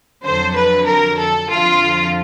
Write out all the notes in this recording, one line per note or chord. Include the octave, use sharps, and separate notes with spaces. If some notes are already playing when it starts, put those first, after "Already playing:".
F2 D3 F#3 C5
B4
A#4
A4
F2 D3 F3 F4